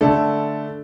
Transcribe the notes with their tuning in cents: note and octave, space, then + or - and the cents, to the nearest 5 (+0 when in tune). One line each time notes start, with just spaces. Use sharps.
D3 +0 A3 -5 D5 +0